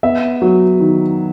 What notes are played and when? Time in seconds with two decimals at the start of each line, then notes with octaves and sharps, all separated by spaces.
0.03 B3 E5
0.42 F#3
0.80 D#3